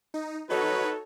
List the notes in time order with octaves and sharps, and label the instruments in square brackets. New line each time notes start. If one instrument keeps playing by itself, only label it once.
[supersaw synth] D#4
[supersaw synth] D#4 F#4 C#5 [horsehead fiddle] A4 [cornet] B4